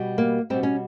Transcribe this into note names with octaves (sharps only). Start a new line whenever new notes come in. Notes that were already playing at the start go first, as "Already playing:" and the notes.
Already playing: B2 G3
A#3
B2 G3 C4
C#4